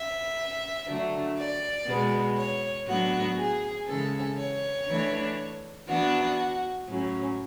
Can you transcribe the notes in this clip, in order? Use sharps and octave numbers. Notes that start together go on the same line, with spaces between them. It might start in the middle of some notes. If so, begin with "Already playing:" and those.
Already playing: E5
D3 F#3 A3 D4
D5
B2 G#3 B3
C#5
A2 F#3 B3 D4 F#4
G#4
C#3 E3 G#3 C#4 A4
C#5
E3 A3 D4
E3 B3 D4 F#4
A2 F#3 C#4